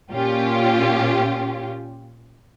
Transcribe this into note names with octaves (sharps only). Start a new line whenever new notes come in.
A#2 C#4 F4 G4